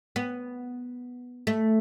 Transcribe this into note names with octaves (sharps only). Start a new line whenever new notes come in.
B3
A3